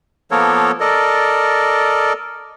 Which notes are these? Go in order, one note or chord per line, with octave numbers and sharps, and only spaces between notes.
F3 A#3 B3 A4 A#4 C#5
A4 A#4 D5 D#5